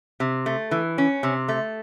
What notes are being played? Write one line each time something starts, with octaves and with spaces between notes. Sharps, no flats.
C3
A3
E3
C#4
C3
A3